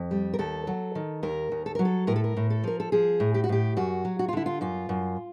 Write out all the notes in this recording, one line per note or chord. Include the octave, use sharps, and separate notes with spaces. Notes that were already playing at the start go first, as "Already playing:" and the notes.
Already playing: F2
G3
A#4
D#2 A4
F#3
D#3
D#2 A#4
D#2
A4
F#3 A#4
A4
A2 A#4
A4
A#4
A2
A4
F3 A#4
A4
F3 G#4
A2
G4
F#4
A2 G4
F#2 F#4
F#3
F#4
F4
D3 E4
F4
F#2 F4
F#2